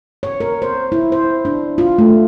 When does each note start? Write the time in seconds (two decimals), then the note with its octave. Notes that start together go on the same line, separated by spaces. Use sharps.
0.23 C#5
0.40 A#4
0.62 C5
0.92 E4
1.12 C5
1.45 D4
1.78 F4
1.98 A3